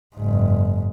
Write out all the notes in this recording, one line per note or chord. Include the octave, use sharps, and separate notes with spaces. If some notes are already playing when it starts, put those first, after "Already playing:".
F#1 G#2